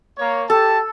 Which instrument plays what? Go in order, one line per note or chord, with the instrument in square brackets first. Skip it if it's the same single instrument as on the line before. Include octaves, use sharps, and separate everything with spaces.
[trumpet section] A#3 C#5
[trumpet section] G4 A5 [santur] A4